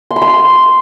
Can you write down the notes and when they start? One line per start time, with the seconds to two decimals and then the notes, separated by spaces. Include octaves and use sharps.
0.11 C6
0.16 B5
0.22 C6